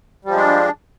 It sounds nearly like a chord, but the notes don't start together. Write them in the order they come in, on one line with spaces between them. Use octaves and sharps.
G3 F3 G#3 D4